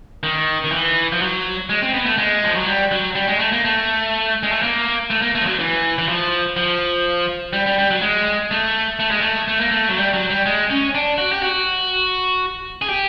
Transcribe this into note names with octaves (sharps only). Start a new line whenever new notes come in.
D#3
D#3
E3
F3
F#3
G#3
C4
B3
A3
G#3
F3
F#3
G3
F#3
G3
G#3
A3
A#3
A3
G#3
A3
A#3
A3
A#3
A3
F3
F#3
E3
E3
F3
F3
G3
G3
G3
F#3
G#3
A3
A3
G#3
A3
A3
A#3
A3
F#3
G3
F#3
G3
G#3
C#4
D4
F#4
G4
F#4
G#4
G4